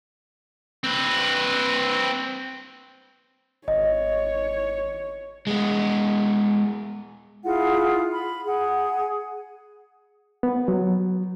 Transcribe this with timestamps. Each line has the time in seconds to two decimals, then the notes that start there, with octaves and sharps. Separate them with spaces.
0.84 C4 B4
3.68 G#1 C#5 D#5
5.47 G#3 B3
7.44 E4 F4 G#4 F#5
8.12 B5
8.46 G#4 F#5
10.43 B3
10.68 F#3